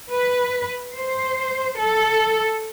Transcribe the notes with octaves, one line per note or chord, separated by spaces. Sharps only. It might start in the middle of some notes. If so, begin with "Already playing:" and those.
B4
C5
A4